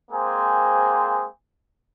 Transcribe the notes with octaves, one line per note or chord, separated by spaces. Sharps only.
G#3 A#3 C4 G#4 C5 G#5